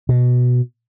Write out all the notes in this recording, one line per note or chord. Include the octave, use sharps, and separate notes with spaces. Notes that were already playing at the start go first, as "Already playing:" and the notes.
B2